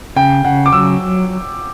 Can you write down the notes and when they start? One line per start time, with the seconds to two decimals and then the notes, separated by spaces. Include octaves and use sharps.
0.16 C#3 G5
0.45 C#3 F#5
0.66 D6
0.72 F#3 E6